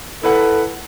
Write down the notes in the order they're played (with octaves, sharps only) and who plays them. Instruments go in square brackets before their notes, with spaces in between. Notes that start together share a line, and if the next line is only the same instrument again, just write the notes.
[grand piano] E4 B4 F#5 [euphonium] A4